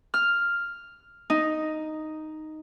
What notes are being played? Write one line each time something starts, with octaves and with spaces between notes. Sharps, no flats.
F6
D#4